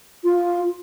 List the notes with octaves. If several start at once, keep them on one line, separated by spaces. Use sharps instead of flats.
F4